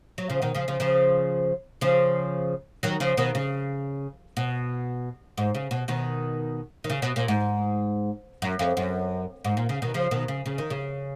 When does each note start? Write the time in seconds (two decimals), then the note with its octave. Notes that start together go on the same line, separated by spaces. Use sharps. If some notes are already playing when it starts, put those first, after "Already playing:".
0.18 F#3
0.30 C#3 F3
0.42 B2 D#3
0.55 C#3 F3
0.68 C#3 F3
0.80 C#3 F3
1.81 C#3 F3
2.83 D#3 F#3
3.00 C#3 F3
3.17 B2 D#3
3.35 C#3
4.37 B2
5.38 G#2
5.55 C#3
5.71 B2
5.88 B2 D#3
6.84 D#3
6.90 C#3
7.02 B2
7.16 A#2
7.28 G#2
8.42 F#2
8.59 F2
8.77 F#2
9.44 G#2
9.57 A#2
9.69 C#3
9.82 B2 D#3
9.94 C#3 F3
10.11 B2 D#3
10.28 C#3
10.46 C#3
10.58 D#3
10.70 C#3